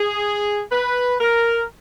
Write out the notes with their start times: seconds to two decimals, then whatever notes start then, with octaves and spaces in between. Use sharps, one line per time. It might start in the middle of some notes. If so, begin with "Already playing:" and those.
Already playing: G#4
0.72 B4
1.20 A#4